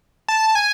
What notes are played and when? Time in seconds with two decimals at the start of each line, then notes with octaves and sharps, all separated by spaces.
0.29 A5
0.55 G#5